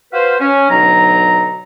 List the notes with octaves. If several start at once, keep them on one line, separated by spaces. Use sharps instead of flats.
F#4 B4 C5 F5
C#4
D2 B2 F#3 D#4 A#5